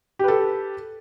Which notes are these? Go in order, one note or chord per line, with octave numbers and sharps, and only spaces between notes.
G4 A4 B4